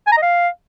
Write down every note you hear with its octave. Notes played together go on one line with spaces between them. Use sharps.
G#5
A#5
D#5
F5